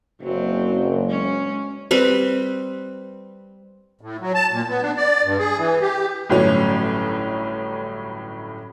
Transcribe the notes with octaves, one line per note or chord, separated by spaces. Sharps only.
F#1 F#3 C4
G#3 C#4
G3 C4 B4
A2
F#3
A5
A#2
B3
D4
D5
G2
G#4
E3
G4
G1 A2 F#3 C#4